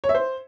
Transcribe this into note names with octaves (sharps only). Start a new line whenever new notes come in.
C#5
E5
C5